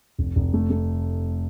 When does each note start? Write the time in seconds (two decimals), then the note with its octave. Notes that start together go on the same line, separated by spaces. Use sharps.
0.19 F1
0.36 F1
0.54 A3
0.70 A3